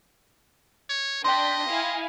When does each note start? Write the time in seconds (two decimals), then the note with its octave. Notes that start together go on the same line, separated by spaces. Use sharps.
0.90 C#5
1.25 D4 D#5 G5 C6 G6 B6
1.69 E4 F5 G#5